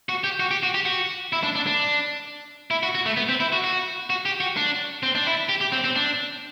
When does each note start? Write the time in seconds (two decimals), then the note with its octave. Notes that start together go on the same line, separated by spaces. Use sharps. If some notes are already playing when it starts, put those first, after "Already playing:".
0.09 F#4
0.24 G4
0.40 F#4
0.51 G4
0.63 F#4
0.74 G4
0.86 F#4
1.33 E4
1.43 D4
1.55 D4
1.67 D4
2.71 E4
2.83 F#4
2.95 F#4
3.06 A3
3.17 B3
3.29 C4
3.40 E4
3.53 F#4
3.64 F#4
4.10 F#4
4.25 G4
4.40 F#4
4.57 D4
5.03 C4
5.15 D4
5.26 E4
5.49 G4
5.61 G4
5.72 C4
5.84 C4
5.96 D4